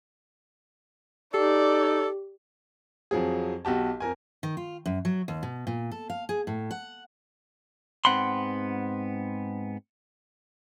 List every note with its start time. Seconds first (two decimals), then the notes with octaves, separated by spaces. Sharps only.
1.34 D#4 G4 A4 D5
3.11 F2 F3 F#3 G#4
3.65 B1 F#4 G4 A5
4.00 F2 A#4 G#5
4.43 D#3
4.57 F4
4.86 F#2
5.05 F#3
5.28 D#2
5.43 B2
5.67 A#2
5.91 A4
6.10 F5
6.29 G#4
6.47 A2
6.71 F#5
8.05 G#2 B3 C4 F#5 B5 C6